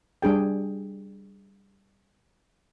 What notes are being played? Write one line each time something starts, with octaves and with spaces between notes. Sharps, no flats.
G3 D4 G#4 G5